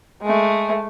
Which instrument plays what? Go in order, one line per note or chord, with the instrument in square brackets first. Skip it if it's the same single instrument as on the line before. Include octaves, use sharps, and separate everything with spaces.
[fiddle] G#3 A3